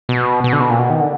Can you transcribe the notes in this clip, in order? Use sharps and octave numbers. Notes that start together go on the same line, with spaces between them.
B2
B2
D3
B2
A#2
B2
D#3
D3